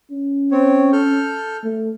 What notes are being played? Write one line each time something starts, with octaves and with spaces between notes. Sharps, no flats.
C#4
C4 C#5
A4 F6 G6
A3